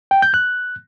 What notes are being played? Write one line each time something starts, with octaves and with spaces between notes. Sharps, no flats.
G5
G6
F#6